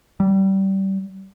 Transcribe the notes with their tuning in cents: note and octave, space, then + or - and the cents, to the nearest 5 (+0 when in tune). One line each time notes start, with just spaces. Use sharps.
G3 -25